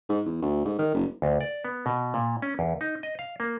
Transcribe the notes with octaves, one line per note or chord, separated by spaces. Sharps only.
G#2
E2
D2
G#2
D#3
F#1
D2
D5
B3
B2
A#2
C#4
E2
D#4
D#5
F5
A#3